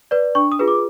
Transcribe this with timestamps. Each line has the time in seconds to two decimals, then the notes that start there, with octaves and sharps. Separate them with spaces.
0.11 B4 D5
0.35 D4 C#6
0.52 D#6
0.59 F4 G#4 B4
0.68 D6